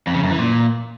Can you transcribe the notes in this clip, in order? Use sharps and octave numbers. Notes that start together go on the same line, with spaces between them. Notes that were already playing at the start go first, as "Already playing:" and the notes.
F2
C#3
F#2
E3
A#2